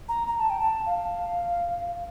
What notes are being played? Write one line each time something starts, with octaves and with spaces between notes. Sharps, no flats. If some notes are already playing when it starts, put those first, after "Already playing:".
A#5
A#5
A5
G5
A5
F5